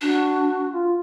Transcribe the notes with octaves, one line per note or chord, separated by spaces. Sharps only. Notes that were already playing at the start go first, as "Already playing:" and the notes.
D4 F#4
F4